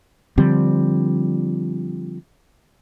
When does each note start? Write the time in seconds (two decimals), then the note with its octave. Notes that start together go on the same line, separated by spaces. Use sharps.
0.38 D3 F3 G3 C4